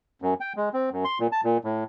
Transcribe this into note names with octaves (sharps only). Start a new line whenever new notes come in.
F#2
G5
G#3
C4
F#2
C6
A#2
A5
A#2
A2